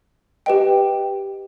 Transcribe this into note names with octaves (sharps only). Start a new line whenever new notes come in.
G4 B4 D#5 G5